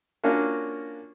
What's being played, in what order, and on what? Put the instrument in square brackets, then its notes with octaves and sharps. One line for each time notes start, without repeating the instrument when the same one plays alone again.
[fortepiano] A#3 C#4 D4 F4 F#4 A#4